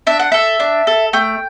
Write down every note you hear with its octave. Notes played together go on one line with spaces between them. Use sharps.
D4 E5
F#5
A4 E5
D4
A4
A3 G5